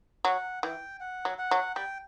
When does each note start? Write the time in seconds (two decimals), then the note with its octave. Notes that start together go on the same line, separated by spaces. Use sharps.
0.25 F#3 F#5
0.63 E3 G5
1.00 F#5
1.25 F#3
1.38 F#5
1.51 F#3
1.75 G3 G5